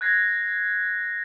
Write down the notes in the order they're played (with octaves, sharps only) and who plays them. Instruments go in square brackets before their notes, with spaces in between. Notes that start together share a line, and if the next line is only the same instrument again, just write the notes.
[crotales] F#6 G#6 A#6 C7